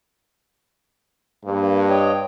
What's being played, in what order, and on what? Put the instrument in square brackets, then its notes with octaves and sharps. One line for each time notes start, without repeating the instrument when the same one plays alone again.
[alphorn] G2 [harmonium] A#3
[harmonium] C#5 D#5 G5